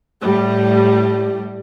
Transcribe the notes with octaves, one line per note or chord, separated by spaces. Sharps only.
A2 G3